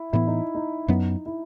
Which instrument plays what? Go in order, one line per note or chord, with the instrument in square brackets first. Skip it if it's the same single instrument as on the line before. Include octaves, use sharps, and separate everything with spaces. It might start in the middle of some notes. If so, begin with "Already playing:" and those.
Already playing: [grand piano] E4
[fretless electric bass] A2 E3 B3 [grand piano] E4
[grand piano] D#4
D#4
[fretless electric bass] F#2 F#3 B3 [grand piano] D#4
[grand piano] E4